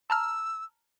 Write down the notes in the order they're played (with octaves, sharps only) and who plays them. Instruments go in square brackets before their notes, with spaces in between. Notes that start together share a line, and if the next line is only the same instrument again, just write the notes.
[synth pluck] A5 A#5 F6 [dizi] E6